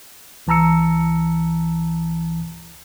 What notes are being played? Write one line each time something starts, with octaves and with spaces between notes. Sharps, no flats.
C#2 E3 A5 A#5 E6 C#7